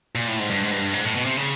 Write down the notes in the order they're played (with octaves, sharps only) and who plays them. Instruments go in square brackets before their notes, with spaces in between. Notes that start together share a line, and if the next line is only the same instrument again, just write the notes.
[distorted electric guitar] A#2
A2
G#2
G2
G#2
G2
G#2
A2
B2
C3
C#3